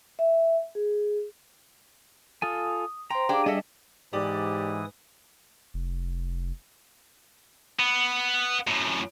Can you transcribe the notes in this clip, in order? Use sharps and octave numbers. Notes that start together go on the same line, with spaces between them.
E5
G#4
F4 A4 G#5 D#6
C5 G5 A#5 C6
D4 G4 G#4 F5 G5
G3 D4 G#4 A4 D#5 E5
G#2 E3 G4 D5 D#6
F1
B3
F#2 A2